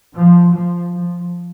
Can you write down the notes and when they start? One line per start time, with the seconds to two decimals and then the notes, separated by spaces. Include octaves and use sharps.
0.14 F3
0.53 F3
0.93 F3